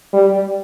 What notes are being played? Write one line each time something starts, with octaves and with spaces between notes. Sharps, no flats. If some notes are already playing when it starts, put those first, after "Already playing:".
G3